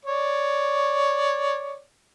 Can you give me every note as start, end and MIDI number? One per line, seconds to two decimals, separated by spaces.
0.05 1.81 73
0.05 1.81 74